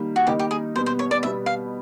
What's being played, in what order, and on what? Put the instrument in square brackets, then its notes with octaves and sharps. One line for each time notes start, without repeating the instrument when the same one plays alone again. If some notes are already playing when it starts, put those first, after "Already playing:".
Already playing: [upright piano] D#3 G3 A#3 D#4
[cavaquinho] F#4
[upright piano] D#3 G3 A#3 D#4 [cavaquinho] G4
[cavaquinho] G4
G#4
[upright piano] B2 G3 B3 [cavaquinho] C5
[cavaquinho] C5
C#5
D5
[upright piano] B2 G3 B3 [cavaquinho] E5
[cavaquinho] F5